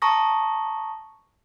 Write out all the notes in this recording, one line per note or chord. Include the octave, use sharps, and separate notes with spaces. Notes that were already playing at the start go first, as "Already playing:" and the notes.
A5 A#5 C#6 D#6 A#6